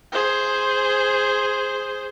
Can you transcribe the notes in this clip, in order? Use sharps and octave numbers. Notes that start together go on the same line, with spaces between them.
G#4 C5